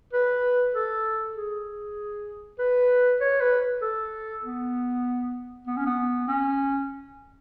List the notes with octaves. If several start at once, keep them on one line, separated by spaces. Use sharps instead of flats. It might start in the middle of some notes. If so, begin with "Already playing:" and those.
B4
A4
G#4
B4
C#5
B4
A4
B3
B3
C#4
B3
C#4